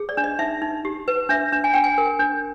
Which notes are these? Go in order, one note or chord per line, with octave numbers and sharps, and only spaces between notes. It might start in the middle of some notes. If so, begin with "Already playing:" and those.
Already playing: G#4
D5
D4
D#5
D#4 E5
D#4
G4
B4
D4 E5
D4
G#5
D4 G5
G#5
A#4
D4